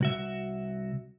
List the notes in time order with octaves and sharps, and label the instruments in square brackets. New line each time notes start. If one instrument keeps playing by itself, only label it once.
[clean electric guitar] C2 F#4 E5